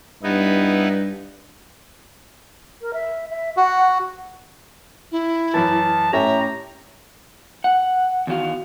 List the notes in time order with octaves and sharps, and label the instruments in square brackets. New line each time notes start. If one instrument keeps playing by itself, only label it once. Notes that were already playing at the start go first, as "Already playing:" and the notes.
[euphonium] G2 [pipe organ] B3 D#4 E4
[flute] A#4
E5
E5
[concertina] F#4 [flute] F#5
[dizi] E4
[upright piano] F#2 E3 [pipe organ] A5
[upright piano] A2 C#4 G4 [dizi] E5 [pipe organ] A#5
[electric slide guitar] F#5
E2 D#3 F#4 F5